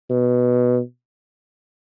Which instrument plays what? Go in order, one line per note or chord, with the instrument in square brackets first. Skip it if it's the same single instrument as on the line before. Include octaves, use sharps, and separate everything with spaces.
[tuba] B2